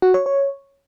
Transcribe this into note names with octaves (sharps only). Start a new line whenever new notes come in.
F#4
C#5
C#5